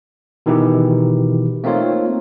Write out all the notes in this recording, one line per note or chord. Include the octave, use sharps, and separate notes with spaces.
B2 D#3 E3 D#4 E4 G4
A3 A#3 C4 D#4 F4 C#5